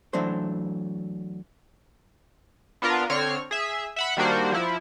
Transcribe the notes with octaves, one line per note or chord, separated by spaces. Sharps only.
E3 F#3 A3 D4 C5
B3 D4 F4 A#4
D3 C4 C#5 F6
G#4 E5
E5 F#5 B5
D#3 G3 A#3 D4 F#4 C5
F3 E4